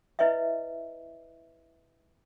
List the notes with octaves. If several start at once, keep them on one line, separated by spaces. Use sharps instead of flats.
E4 B4 C#5 D#5 E5